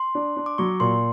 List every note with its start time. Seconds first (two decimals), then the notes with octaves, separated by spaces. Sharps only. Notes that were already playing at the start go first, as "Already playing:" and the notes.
Already playing: C6
0.15 D4
0.37 D4
0.46 D6
0.58 F#3 C#6
0.80 A#2 C6